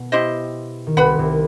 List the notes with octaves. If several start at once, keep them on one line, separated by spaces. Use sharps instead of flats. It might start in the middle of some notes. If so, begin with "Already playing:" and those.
Already playing: B2
E4 G4 C5 D#5
D#3
C2 C3 B4 F#5 B5
C2 C3